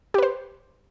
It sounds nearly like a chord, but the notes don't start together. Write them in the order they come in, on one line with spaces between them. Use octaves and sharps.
G4 B4 C5